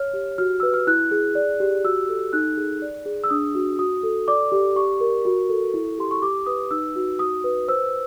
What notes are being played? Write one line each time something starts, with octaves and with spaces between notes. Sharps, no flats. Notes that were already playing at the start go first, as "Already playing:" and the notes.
Already playing: C#5 F6
G4
F#4 F6
B4 E6
F6
E4 F#6
G#4
D5
G4
F#4 E6
A4
D#4 F#6
G#4
D5
G#4
E6
D4 D#6
F#4
F#4 D#6
A4
D5 D6
G4
G4 C#6
A#4
F#4
A4
E4
G4 C6
C#6
G4 D6
B4 D#6
D#4 E6
F#4
F#4 D#6
B4
C5 E6